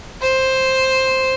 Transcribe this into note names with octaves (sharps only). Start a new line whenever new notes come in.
C5